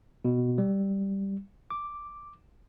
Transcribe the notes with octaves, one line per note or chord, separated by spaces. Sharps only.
B2
G3
D6